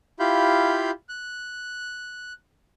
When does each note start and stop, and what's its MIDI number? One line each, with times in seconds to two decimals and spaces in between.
0.20 0.91 64
0.20 0.91 65
0.20 0.91 67
0.20 0.91 77
0.20 0.91 83
0.20 0.91 91
1.09 2.33 90